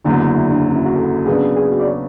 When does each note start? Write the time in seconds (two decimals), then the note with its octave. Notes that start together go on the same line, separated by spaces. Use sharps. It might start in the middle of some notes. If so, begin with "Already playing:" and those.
0.04 F#1 E2 D3 F#3 D4
0.20 E4
0.30 F#4
0.35 E4
0.51 D4
0.65 C#4
0.71 F#4
0.76 E4
0.86 F#4
0.96 A4
1.26 C#3 F#3 B3 D4 G#4
1.56 G#4
1.71 F#4
1.80 D5
1.87 C#5